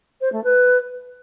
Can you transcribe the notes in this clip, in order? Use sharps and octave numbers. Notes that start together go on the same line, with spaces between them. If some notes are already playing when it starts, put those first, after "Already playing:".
C5
A3
B4